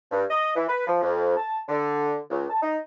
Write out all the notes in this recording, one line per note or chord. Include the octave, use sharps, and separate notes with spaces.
G2
D#5
E3
B4
F3
F2
A5
D3
C#2
A5
D#4